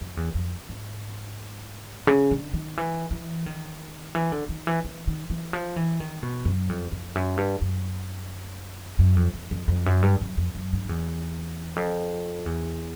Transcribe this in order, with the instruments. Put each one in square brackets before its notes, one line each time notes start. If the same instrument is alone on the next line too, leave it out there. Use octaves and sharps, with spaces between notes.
[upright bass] F2
E2
F2
G#2
C#3
D3
D#3
E3
E3
D#3
E3
D3
D#3
E3
E3
D#3
E3
F3
E3
D#3
B2
F#2
F2
F2
F#2
G2
F#2
F#2
F2
F2
F2
F2
F#2
G2
F#2
F2
F#2
G2
F2
E2
F2
E2